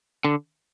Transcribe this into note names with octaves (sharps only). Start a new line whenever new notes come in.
D3